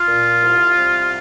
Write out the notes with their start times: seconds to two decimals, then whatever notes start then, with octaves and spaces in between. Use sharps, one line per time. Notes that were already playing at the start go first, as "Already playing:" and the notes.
Already playing: F4
0.08 A#2
0.42 C2
0.76 C2